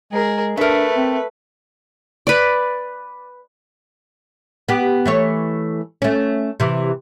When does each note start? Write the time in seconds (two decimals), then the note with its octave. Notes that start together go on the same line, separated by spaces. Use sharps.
0.12 G#3 G#4 A#4
0.57 A3 D4 A#4 B4 E5
0.96 C4
2.27 B4 D5
4.69 B3 G4
5.06 E3 A3 C#5
6.02 A3 C#4
6.60 C3 E3